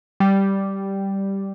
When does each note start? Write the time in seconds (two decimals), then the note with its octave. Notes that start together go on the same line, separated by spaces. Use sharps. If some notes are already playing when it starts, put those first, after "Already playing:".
0.20 G3